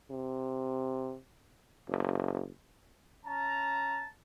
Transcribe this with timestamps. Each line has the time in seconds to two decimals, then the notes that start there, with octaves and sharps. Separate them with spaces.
0.11 C3
1.88 F#1
3.26 C#4 A5 A#5